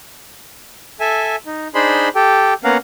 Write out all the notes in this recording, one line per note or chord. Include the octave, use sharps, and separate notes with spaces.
A4 E5 G#5
D#4
D4 D#4 G#4 C5 B5 C6
G4 A4 G5
A#3 B3 C#4 A#4 F5 F#5